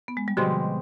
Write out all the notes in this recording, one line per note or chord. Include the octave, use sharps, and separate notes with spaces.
B3
G#3
G3
B2 D3 F3 G#3 C4 G4